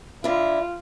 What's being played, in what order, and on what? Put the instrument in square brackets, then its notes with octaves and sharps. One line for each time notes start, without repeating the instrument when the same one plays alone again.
[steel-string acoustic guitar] D3 E4 [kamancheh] F4